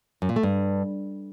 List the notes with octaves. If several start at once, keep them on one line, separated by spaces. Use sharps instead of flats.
F#2
A#2
A3
G2